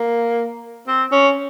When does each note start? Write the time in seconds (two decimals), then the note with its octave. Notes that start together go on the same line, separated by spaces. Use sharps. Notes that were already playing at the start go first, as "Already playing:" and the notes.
Already playing: A#3
0.88 C4
1.12 C#4